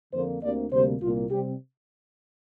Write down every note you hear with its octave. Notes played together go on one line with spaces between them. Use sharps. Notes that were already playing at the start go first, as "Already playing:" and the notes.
F2 D3 A#3 C5
D2 C3 A#3 D5
D2 C3 G3 A#3 D4 C5
C2 A#2 A#3 F4
C3 G3 C4 G4